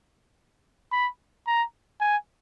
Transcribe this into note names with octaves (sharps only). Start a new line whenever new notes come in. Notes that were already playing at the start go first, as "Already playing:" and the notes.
B5
A#5
G#5